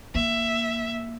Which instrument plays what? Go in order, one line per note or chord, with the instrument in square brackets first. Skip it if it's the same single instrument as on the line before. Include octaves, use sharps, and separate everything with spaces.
[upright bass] A#3 [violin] E5